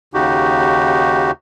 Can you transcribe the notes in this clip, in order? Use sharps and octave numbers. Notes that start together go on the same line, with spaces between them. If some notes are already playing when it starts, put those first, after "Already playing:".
D#2 C#3 D#4 F#4 G4